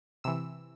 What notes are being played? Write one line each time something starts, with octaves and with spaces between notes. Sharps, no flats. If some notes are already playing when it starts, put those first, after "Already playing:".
C3 E3 E6